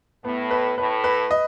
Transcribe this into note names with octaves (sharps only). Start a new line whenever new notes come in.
A2 B3
B4
A2 B4
B4
D#5